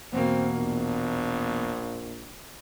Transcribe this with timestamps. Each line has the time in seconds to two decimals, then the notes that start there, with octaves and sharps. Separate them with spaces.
0.13 E2 B2 A#3 C4
0.54 A#1